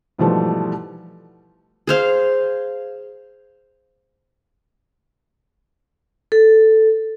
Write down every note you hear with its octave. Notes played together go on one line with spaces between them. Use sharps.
G#2 B2 E3 F3 G3 A3
G#4 C5 F5
A4